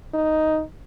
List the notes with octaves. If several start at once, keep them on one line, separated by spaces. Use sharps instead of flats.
D#4